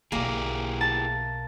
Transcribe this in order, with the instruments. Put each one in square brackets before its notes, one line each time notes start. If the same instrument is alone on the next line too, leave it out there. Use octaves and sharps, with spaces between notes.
[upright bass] B1 B2 [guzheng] A#3 [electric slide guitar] E4 G4 G#4
[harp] A5